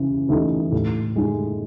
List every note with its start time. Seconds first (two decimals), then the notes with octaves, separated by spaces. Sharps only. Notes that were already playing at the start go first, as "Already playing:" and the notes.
Already playing: C#3 E3
0.29 E3 A3 D#4
0.72 A2
1.16 G#3 D#4